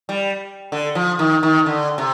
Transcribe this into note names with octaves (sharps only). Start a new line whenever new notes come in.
G3
D3
F3
D#3
D#3
D3
C3